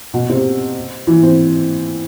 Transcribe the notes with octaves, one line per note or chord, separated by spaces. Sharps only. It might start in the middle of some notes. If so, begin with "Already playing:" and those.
B2
C3
E3
C4